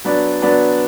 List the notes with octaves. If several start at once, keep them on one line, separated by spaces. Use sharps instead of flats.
F#3 B3 D4
F#3 B3 D4